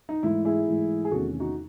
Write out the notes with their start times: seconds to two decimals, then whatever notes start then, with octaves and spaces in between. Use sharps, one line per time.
0.09 D#4
0.23 G#2 E3 A3 E4
0.45 E4 G#4
0.67 G#2 E3 A3
1.05 G#4
1.11 E2 C3 D#3 A3 C#4 F#4 A4
1.40 D#4 F#4